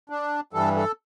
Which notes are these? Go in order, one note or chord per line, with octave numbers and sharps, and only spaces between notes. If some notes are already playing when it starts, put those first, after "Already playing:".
D4
G2 E3 G3 A4
A4